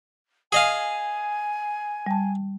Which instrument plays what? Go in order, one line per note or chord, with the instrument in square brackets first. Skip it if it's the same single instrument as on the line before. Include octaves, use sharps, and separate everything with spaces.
[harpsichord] G#4 D#5 F5 [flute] G#5
[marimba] G3 A5